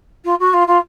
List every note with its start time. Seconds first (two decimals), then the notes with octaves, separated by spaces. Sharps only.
0.24 F4
0.39 F#4
0.53 F4
0.67 F4